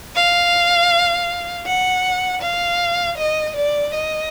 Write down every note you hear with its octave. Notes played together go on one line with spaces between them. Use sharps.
F5
F#5
F5
D#5
D5
D#5